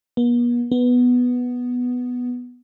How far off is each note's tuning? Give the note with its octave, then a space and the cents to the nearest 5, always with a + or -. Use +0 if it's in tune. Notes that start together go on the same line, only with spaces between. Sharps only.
B3 -45
B3 +0